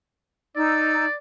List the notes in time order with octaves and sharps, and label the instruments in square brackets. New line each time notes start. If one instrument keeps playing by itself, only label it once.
[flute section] D#4 E6 [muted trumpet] D5